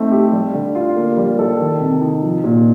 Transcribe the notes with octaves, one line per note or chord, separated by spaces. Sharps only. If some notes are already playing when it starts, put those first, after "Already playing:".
Already playing: A3 C4 D#4
G4
G3
D3
F4
A#3
G3
A4
D#3
C3
D#4
F3
A#2